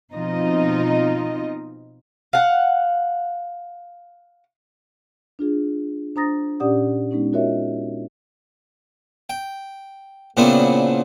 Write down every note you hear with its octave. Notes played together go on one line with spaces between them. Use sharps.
B2 F3 C4 D#4 F4 D#5
F5 F#5
D4 F4 G#4
D4 C5 A#5 D#6 A6 A#6
A#2 C#4 G4 D5 F#5 D#6
G#3 B3 C#4 D#4
F4 F#4 A#4 C#5 D#5 E5
G5
A#2 C#3 B3 C4 D4 E4